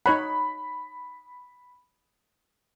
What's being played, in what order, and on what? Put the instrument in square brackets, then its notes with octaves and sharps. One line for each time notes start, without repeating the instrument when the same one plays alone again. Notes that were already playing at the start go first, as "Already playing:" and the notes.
[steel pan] D#4 C#5 F#5 [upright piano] B5